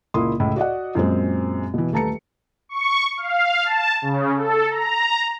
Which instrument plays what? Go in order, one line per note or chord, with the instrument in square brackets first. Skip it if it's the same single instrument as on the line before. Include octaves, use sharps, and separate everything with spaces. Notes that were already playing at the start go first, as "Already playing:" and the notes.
[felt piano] C#2 A#2 A#3 E4 C6 D#6
C#2 A2 E4
F#4 D5 D#5 F#5
F#2 A#2 G#3 C4
B2 E3
D#1 A3 B4 A5 A#5 C#7
[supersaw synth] C#6
F5
A5
C#3
A4
A#5